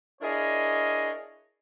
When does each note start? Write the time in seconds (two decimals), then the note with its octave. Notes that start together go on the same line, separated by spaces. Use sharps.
0.21 D4 E4 G#4 A#4 C#5 D#5